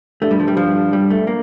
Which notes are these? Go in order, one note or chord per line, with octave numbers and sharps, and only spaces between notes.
G2 A3
G3
F3
G3
F3
G3
A3
A#3